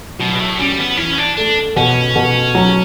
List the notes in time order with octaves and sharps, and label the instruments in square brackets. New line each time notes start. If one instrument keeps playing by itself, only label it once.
[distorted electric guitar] B2 [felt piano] F#3
[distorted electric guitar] A2
[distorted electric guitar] G3 [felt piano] C#4
[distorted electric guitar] B3
[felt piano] E3 [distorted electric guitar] C#4
[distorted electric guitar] D4
[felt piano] A3 [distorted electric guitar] D4
[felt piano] B2 [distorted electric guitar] C#4
[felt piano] B2
F#3